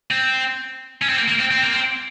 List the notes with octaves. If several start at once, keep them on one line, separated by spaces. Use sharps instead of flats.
C4
C#4
C4
A#3
A#3
C4
C4
A#3
C4